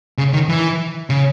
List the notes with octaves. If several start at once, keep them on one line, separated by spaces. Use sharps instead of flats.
C#3
D#3
E3
C#3